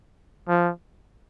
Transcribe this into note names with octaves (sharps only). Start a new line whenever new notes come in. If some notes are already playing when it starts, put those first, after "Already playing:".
F3